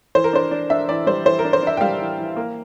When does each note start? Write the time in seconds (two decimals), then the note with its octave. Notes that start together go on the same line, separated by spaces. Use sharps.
0.15 E3 C5
0.24 A#4
0.33 D4 C5
0.51 D4
0.70 D4 E5
0.89 E3 D5
1.07 G3 C5
1.26 E3 C5
1.39 A#4
1.45 D4
1.53 C5
1.63 D4 E5
1.77 G5
1.81 G3 F5
1.99 E3
2.18 E3
2.37 A#3